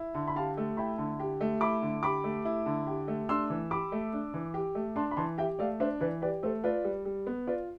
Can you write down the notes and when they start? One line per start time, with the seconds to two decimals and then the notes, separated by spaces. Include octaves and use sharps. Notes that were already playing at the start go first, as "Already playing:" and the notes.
Already playing: E4
0.14 D3
0.27 B5
0.36 G4 F5 A5
0.57 A3
0.77 E4 G5 B5
0.98 D3
1.20 G4
1.41 A3
1.61 E4 B5 D6
1.82 D3
2.03 G4 B5 D6
2.24 A3
2.45 E4
2.66 D3
2.87 G4
3.08 A3
3.29 D4 C6 E6
3.50 E3
3.71 G4 B5 D6
3.92 A3
4.13 D4
4.34 E3
4.54 G4
4.75 A3
4.96 D4 A5 C6
5.11 B5
5.17 E3 A5 C6
5.38 G4 E5 G5
5.59 A3 D5 F5
5.80 D4 C5 E5
6.00 E3 B4 D5
6.22 G4 B4 D5
6.43 A3 A4 C5
6.64 F4 B4 D5
6.84 G3
7.05 G3
7.27 B3
7.47 F4 B4 D5